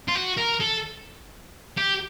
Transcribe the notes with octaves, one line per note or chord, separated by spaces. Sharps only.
F4
F#4
A#4
A4
G4